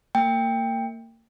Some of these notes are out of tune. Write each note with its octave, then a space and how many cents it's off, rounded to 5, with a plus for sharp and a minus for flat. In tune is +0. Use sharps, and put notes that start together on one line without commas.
A#3 -35 G5 +15